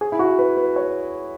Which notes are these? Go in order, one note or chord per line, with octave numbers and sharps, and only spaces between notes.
G#4
E4
F#4
B4
B4
C#5